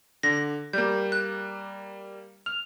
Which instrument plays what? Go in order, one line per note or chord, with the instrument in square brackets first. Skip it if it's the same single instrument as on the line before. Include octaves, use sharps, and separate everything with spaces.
[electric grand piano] D3 [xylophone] A#6
[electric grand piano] G3 A#3 [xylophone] G6
[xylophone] F#6
[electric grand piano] F6 [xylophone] F7